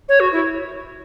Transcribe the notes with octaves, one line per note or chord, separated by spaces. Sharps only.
C#5
F#4
E4